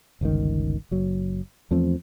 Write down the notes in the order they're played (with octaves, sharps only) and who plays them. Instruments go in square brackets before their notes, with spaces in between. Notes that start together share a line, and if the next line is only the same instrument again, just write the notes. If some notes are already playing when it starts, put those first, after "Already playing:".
[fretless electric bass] G1 C#2 C3 D#3
F#1 F#3
E2 F3 A3 C4